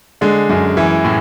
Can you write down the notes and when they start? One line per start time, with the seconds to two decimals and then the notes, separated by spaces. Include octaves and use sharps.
0.21 D3 G#3
0.49 F#2
0.77 E3
1.04 A2